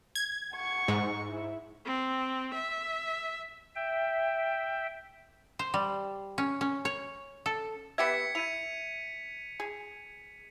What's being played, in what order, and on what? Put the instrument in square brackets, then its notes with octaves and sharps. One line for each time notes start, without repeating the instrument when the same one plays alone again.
[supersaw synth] G#6
[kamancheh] F#5 C#6
[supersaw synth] G#2
[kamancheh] E4
[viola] C4
E5
[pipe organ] E5 G5
[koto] C5
G3
C#4
C#4
C#5
A4
[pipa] B3 G4 E5 [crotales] G#6 B6 C#7
[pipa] E4 [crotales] G#6 D#7 F7
[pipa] G#4